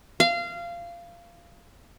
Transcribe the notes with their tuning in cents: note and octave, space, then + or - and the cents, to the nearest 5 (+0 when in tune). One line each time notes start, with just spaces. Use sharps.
F5 -20